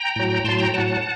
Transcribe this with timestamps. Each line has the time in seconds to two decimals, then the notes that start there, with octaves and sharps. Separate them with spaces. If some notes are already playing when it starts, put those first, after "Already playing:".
Already playing: G5 A#5
0.16 A2 F#3
0.44 A2 F#3 A5 C6
0.60 G5 A#5
0.74 A2 F#3 F#5 A5